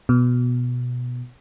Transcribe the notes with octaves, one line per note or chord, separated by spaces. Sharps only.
B2